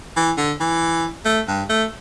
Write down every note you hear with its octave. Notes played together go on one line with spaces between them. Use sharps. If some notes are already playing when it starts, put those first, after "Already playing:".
E3
D3
E3
A3
G2
A3